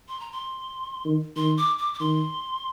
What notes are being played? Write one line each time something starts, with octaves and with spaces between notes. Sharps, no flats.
C6
A#5
C6
D#3
D#3 C6
D6
D6
D6
D#3 C6